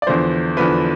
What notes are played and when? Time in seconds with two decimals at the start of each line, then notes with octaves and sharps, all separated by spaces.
0.02 D5
0.07 E2 D3 F3 C5
0.57 E2 D3 F3 B4